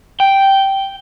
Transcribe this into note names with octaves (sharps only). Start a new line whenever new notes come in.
G5